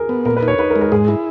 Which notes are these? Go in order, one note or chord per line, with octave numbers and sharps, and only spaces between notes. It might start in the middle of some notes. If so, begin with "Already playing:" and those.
Already playing: G#4 A#4
B3
A#2 A#4
B4
D#4
C#5
D#4 B4
A#4
G#3
A#4
G#2 G#4
E4